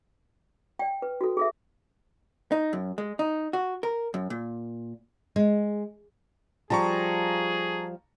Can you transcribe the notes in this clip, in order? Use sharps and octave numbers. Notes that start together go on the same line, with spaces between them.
D5 G5
B4
F#4 A4
G#4 A4 E5
D#4
F#2
G#3
D#4
F#4
A#4
F#2
A#2
G#3
F3 G3 F4 G#4 A5 A#5 C#6